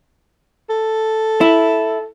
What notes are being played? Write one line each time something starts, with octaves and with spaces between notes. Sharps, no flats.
A4
E4